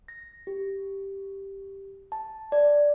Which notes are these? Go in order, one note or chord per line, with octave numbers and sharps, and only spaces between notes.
A#6
G4
A5
D5